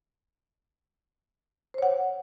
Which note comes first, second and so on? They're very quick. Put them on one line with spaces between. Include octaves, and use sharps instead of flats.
C5 C#5 F#5